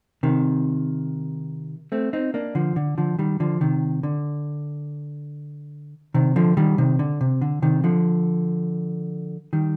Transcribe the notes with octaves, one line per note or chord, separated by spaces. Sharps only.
C3 D#3
A3 C4
C4 D#4
A#3 D4
D3 F3
D3
D3 F3
D#3 G3
D3 F3
C3 D#3
D3
C3 D#3
D3 F3
D#3 G3
C3 D#3
D3
C3
D3
C3 D#3
D3 F3
D#3 G3